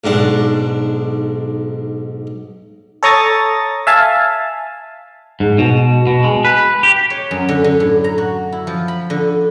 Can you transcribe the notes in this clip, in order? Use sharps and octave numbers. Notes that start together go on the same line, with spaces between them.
B1 G#2 D4 F#5
A4 C#5 A#5 C#6 D#6 A6
E5 F5 G#5 A5
G#2
B2
B2
G#3
B4
G4
C#5
F#2
D3
D3
A2
A#5
F#4
E4
F3
B5
D3